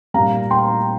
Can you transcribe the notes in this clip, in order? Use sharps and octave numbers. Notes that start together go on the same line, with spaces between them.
A#2 G3 F5 A#5
G5 C6